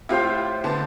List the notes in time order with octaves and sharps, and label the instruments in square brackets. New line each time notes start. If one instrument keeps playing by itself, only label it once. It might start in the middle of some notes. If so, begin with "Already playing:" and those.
[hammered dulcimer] A2 C5 [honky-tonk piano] E4 F4 G4
[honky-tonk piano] D3 B3 A5